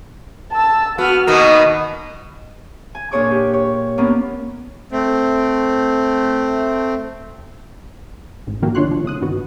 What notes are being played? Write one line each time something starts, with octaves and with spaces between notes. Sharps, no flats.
A5 E6
B3 F#4 F6
B2 D#3 A#3 D#6
G#5
A#2 D4 G#4 C#5 G#5 D6
G4
C#5
A#3 B3 C#4 D4
A3 C4
A1 G#2
D#3 F3 A#3 F#4 G4 A4
D#3 D4 F4 C#5 C6 F#6
C#3 F3
A2 C3 D#6 F#6
G2 D3 D#3 B3 F#4